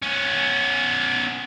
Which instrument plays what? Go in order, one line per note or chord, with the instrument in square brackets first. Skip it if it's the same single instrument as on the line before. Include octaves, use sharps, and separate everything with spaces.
[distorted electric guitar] B3 C#4